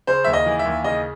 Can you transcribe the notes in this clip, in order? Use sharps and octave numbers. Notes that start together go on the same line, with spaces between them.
C#3 C5
D#2 E5
D#5
E3
E5
D#2
C#3 D#5